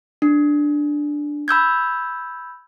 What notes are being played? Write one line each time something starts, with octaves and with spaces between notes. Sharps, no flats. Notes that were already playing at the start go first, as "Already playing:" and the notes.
D4
B5 E6 G6 G#6